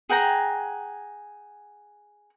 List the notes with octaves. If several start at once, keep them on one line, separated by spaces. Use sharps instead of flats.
G#4 F#5 G5 A#5